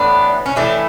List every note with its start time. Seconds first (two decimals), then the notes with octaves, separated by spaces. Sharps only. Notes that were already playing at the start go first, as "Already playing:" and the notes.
Already playing: A2 E3 B3 D4
0.46 C#4
0.56 A2 E3 A3 D4